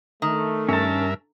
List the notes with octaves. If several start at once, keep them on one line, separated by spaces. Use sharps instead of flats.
D#3 A3
G2 C#4 A#4 E5 A5